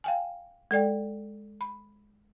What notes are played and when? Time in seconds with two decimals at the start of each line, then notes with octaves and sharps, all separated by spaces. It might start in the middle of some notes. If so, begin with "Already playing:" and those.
0.04 F5 G5 G#5
0.71 G#3 A4 D5 G5
1.61 B5